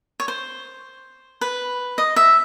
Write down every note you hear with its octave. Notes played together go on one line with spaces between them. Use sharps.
C#5
C5
B4
D#5
E5